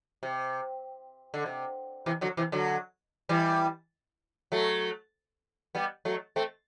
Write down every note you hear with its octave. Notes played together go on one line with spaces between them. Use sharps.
C3
D3
C3
C3 E3
D3 F#3
C3 E3
D3 F#3
E3 G3
F#3 A3
G3 B3
F#3 A3
A3 C4